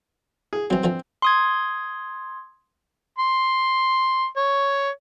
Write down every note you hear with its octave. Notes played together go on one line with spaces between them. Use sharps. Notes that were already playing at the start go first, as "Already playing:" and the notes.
G#4
E3 F#3 C4
D3 E3 F3
C6 D#6 G#6
C6
C#5